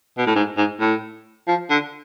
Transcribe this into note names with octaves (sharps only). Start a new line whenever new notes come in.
B2
A2
G#2
G#2
A2
F3
D3